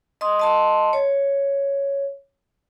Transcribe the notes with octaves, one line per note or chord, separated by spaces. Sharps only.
D#5 C6 D#6
D#5 A5 C6
C#5